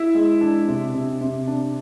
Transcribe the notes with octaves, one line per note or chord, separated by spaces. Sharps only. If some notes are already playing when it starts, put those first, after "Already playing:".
Already playing: E4 E5
G#3
D4
C3
C3
C3
D4